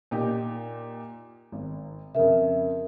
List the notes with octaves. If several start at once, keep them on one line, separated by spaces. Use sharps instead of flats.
A#2 D#4 G4
G#1
F2 C#3 A#4 E5